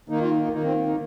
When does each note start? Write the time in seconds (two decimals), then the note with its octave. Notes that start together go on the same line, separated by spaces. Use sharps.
0.09 D#3 A#3 D#4
0.21 F4
0.31 D#4
0.42 D#4
0.52 D#3 A#3 D#4
0.63 C4
0.86 D#4